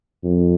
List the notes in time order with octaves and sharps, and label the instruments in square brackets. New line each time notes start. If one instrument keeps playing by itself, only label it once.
[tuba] F2